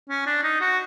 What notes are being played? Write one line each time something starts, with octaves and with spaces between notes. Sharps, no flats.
C#4
D4
D#4
F#4